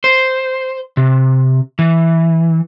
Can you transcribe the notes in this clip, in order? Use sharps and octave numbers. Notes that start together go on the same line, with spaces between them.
C5
C3
E3